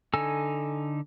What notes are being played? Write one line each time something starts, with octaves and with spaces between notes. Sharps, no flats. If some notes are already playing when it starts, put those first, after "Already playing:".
D3 D#4 A4 G#5 E6